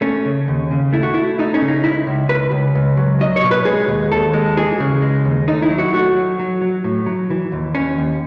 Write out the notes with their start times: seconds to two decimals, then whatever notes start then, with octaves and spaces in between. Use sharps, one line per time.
0.01 A3 C#4
0.25 C#3
0.48 D#2
0.71 C#3
0.93 A3 E4
1.03 F#4
1.14 A3 E4
1.39 A3 D#4
1.54 C#4
1.62 C#3
1.68 D#4
1.83 C#2 E4
2.07 C#2
2.29 C#2 B4
2.52 C#2
2.75 C#2
2.97 F#3
3.20 F#3 D#5
3.36 C#5
3.44 B2
3.51 B4
3.65 G#3 G#4
3.89 D#2
4.12 D#2 A4
4.33 G#3
4.57 E3 G#4
4.80 C#3
5.02 G#3
5.25 D#2
5.48 A3 D#4
5.62 E4
5.70 F#3
5.78 F#4
5.93 A3 F#4
6.16 F#3
6.39 F#3
6.61 F#3
6.84 A2
7.06 F#3
7.30 E3
7.52 D#2
7.75 D#2 C#4
7.98 D#2